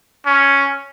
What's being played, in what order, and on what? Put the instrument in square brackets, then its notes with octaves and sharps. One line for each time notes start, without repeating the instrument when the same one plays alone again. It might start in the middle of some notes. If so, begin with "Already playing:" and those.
[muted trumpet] C#4